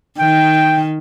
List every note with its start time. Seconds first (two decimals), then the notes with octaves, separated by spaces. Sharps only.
0.19 D#3 G5